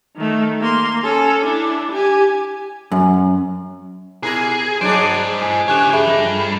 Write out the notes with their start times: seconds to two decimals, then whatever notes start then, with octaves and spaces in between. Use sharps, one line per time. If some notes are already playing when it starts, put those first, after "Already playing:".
0.16 D#3 A3
0.61 A#3 C6
1.04 C#4 A4
1.43 D4 E4
1.92 G4 G#5
2.92 F#2
4.23 B2 E4 G#4 A#4
4.81 F#3 D4 G#4 C5 D#5 D7
5.42 A2 G#5
5.68 C#3 E4 G4 C#5 G#5 F#6 E7
5.93 G2 G#4 E5
6.05 F2 A#4